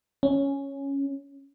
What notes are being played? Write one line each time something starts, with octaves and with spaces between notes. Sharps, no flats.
C#4